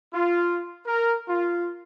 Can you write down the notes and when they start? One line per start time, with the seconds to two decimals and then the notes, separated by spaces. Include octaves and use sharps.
0.13 F4
0.86 A#4
1.29 F4